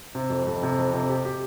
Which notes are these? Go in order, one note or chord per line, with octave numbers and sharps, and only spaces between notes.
C3
F2
F2
C3
F2
C3
G4
G4